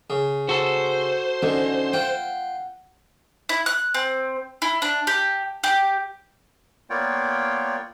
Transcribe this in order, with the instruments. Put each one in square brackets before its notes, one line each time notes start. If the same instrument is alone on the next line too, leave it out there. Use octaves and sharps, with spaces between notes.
[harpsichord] C#3
[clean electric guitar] F#4 A4 [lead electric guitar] C5
[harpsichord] D3 [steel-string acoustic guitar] C#4 D#4 F#5
[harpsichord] F4 G5 [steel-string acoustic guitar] F#5
[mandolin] E4
F#6
C4
E4
D4
G4
G4
[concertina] A#3 B3 F4 C#5 D5 G5